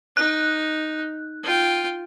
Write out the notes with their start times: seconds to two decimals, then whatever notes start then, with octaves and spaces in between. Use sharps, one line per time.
0.17 D#4 F#6
1.43 F4 G5